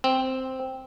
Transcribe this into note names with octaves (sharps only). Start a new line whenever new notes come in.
C4